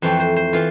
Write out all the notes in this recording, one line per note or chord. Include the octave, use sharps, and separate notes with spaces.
F2 E3 A3 C5
C5
C5
E3 F4